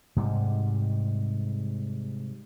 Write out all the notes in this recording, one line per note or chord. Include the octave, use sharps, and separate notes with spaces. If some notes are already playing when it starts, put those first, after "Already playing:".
G#2 C3 G3